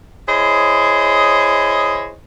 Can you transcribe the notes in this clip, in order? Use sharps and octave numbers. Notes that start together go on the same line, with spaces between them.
E4 G#4 C5 C#5 D#5